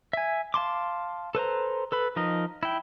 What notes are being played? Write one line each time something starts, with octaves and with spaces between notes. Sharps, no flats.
E5 G#5
F5 A5 C6 D6
A4 B4 C5 A#5
A4 B4 B5
F3 D#4 A#4 D#5
E4 G5